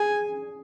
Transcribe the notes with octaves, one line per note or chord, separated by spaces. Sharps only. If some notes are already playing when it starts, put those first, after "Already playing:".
Already playing: G#4 G#5